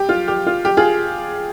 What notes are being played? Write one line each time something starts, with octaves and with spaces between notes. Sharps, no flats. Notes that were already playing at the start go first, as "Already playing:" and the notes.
Already playing: G4
F4
G4
F4
G4
F4 G#4